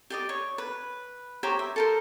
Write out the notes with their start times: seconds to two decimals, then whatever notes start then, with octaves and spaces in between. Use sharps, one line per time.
0.10 G4 D5 D#5
0.29 C#5
0.58 B4
1.43 G4 C5 C#5 A#5
1.59 E5
1.76 A4 A#4 C5